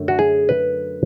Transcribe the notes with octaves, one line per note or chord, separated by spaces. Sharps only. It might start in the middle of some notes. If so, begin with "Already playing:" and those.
Already playing: F#2 D3 F#3 A3
F#4
G#4
B4